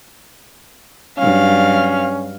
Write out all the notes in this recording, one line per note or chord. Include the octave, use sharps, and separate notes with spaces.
G2 F#3 C#4 F5